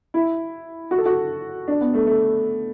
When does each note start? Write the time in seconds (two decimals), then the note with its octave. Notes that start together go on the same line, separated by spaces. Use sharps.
0.14 E4
0.91 F#4
0.98 A4
1.06 F#4
1.68 D4
1.81 B3
1.94 A3
2.07 A3